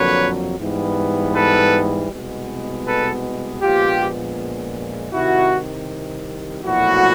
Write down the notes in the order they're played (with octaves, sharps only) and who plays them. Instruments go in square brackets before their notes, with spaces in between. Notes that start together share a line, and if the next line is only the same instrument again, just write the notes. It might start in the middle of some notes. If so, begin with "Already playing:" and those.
Already playing: [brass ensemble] F2 D3 F#3 A#3 B4 C#5
G#2 E3 G3 B3
A4 B4
C2 B2 G#3 B3
A4 B4
A#1 A#2 F3 G#3 B3 F4 G4
C2 C3 D#3 E4 F#4
B1 A#2 F3 A3 E4 F#4